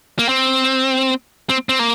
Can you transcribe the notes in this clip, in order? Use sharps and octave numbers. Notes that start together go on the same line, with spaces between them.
A#3
C4
C4
C4
A#3